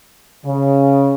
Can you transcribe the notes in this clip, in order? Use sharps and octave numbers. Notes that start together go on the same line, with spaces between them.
C#3